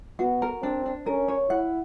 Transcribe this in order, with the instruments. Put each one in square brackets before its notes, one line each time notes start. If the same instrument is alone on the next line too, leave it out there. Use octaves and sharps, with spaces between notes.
[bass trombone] B3 [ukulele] F#4
[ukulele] A#4
[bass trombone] C4 [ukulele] D4
[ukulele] D4
[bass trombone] C#4 [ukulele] A#4
[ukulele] C#5
[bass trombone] E4 [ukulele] F#5